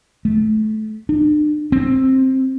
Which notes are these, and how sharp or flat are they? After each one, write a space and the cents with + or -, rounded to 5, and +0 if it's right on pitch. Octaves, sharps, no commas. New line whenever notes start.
A3 -25
D4 +45
C4 +10